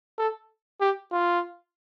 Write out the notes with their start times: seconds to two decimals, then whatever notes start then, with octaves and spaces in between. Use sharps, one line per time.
0.18 A4
0.81 G4
1.12 F4